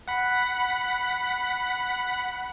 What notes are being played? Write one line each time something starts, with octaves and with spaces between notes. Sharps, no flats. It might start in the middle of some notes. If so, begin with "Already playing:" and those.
F#5 B5